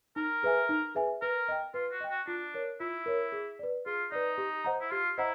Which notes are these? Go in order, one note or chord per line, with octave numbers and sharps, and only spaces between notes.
D#4 A#4
G#4 B4 E5 G#5
D#4
G#4 B4 E5 G#5
A#4 B4
D#5 G5
F4 B4
F#4
D#5 G5
F#4
D4 F4
A#4 C#5
E4 F4
A#4 C#5
G#4
B4 D5
F4 G#4
D#4 B4 D5
G4
C5 D#5 F#5 A#5
E4
F4 G4
E4 C5 D#5 F#5 A#5